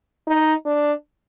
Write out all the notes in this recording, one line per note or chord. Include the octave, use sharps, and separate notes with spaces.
D#4
D4